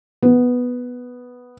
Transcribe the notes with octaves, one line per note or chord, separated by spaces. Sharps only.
B3